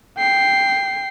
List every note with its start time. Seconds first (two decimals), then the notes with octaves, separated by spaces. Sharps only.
0.18 G5 C7